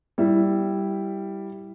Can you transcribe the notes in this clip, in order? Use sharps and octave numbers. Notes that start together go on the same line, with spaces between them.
G3 E4